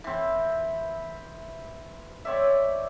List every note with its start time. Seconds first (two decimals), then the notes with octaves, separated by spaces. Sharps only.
0.04 E3 C4
2.25 C4 C#5 D5 E5